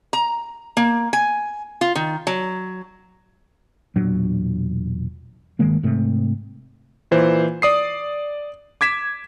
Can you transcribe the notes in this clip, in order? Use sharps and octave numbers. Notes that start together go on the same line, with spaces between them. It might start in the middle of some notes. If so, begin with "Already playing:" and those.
A#5
A#3
G#5
F4
D#3
F#3
E1 A#2 F#3 D4
G1 D#3 G#3 A#3
G#2 C3 A3
A#2 E3 C5
D5 D#6 C7
D6 G#6 B6 E7